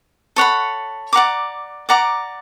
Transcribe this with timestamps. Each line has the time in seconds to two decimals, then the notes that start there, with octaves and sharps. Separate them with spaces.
0.36 A4 C#5 F#5 B5
1.13 D5 F#5 A#5 D6
1.89 D5 F#5 A#5 D6